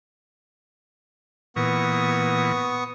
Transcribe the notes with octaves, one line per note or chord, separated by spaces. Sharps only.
A#2 E3 B3 C#6 D#6